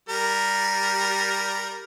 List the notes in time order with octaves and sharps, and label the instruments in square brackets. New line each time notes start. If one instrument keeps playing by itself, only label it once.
[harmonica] G3 A#4